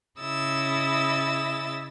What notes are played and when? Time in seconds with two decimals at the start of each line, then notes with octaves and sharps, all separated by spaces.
0.19 C#3 E4 D#5 E6 A6